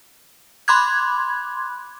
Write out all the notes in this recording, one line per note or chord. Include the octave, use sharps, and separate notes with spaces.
B5 C6 D6 F#6 G#6